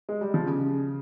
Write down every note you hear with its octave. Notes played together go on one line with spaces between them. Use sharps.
G#3
G3
F3
C#3